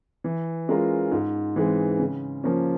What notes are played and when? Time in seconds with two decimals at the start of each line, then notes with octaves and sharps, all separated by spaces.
0.24 E3
0.69 G#3 C#4 F4 A#4
1.11 G#2
1.56 E3 G#3 C4
1.99 C#3
2.44 F3 A#3 C#4